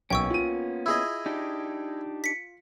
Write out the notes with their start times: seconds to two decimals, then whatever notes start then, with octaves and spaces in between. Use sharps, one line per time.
0.10 B1 A#3 B3 C#4 G5 C#6 E6
0.30 F4 D#7
0.86 E4 G#4 D#5
1.26 D4 D#4 G4
2.24 B6 C#7